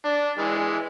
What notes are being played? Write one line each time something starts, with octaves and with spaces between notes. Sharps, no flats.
D4
E3 G#3